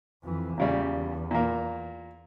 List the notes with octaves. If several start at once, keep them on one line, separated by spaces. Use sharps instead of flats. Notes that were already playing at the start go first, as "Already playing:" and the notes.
F2 E3
E2 A#2 C#3 G3
A#2 A#3